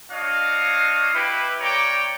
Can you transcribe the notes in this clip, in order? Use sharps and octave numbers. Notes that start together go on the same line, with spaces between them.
D4 F#4 C#5 D#5 F5
E4 G4 B4
A#3 C#5 D5 G5 A#5 D6